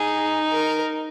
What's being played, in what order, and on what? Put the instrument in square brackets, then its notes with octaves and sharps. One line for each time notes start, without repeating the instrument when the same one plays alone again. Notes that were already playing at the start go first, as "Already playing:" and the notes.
Already playing: [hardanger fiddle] D#4 [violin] G#4
[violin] A#4